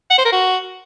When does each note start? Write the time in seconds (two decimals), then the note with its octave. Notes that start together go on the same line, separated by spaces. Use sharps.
0.10 F#5
0.18 C5
0.25 A#4
0.32 F#4